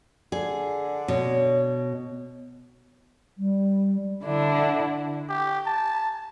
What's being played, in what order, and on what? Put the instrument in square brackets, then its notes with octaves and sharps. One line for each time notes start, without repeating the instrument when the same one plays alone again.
[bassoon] D3 [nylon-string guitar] G#4
[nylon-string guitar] B2 [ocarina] C#5
[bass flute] G3
[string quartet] D3 D4 E4
[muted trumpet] G4
A5